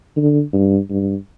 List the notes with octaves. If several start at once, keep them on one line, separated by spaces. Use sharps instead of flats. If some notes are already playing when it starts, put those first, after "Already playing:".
D3
G2
G2